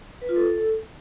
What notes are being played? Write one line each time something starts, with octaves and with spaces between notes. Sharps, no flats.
B4
F4
A4